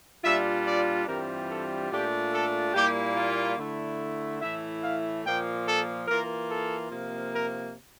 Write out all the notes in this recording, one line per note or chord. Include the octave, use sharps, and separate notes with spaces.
A#2 G3 D4 F4 E5
D5
G2 E3 G3 C4 F4 A#4
A4
A#2 A3 D4 F4 G4
A4
A#2 G3 A#3 E4 G4
F4
D3 A3 E4
A2 E3 A3 E4 E5
F5
A#2 F3 A#3 G5
A4
E3 A#3 F4 A#4
A4
C3 F3 A#3
A#4